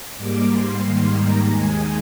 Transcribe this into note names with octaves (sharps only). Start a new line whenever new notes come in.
G#2 G3 A#3 D6
C6
G#2 D#3 G3 A#3
A#5
D#2 D#3 G#3 G#5